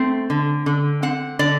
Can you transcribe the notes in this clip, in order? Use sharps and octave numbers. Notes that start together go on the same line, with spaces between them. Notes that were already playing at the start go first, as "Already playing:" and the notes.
Already playing: A3 C4
D3
D3
C4 F#5
D3 D5